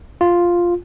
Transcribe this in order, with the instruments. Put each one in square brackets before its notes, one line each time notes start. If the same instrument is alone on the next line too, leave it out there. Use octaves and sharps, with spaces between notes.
[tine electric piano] F4